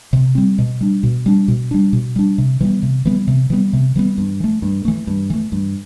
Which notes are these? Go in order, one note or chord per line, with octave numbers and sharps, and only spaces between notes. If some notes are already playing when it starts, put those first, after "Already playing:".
C3
G3 C4
B2
G3 D4
B2
G3 D4
B2
G3 D4
B2
G3 D4
C3
E3 G3 B3
C3
E3 G3 B3
C3
E3 G3 B3
C3
E3 G3 B3
G2
E3 A3
G2
E3 A3
G2
E3 A3
G2